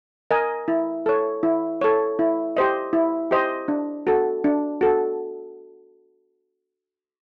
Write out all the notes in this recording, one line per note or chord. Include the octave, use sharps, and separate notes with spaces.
A#4 D#5 G#5
E4
A4 C#5
E4
A4 C#5
E4
G4 C5 D#5
E4
G4 C5 D#5
D4
F#4 A4
D4
F#4 A4